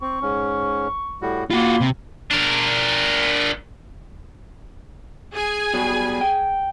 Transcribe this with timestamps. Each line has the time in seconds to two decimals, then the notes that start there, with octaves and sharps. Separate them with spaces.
0.02 C4 C#6
0.22 G#2 C#4
1.22 A2 G3 F#4
1.51 A#3 F4 F#4 B5 C6
1.80 C3
2.31 D4 A#4
5.33 G#4 G#5
5.74 B2 F#3 G3
6.21 G5